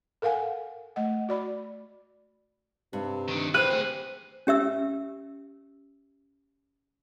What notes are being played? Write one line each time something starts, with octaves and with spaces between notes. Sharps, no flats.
A4 A#4 F5 F#5 G#5
A3 D#5 F#5
F#4 D5 B5
G2 C3
D3 D#3
E2 G4 B4 C5 F#6 D#7
D2 G#4
C#4 G4 E5 E6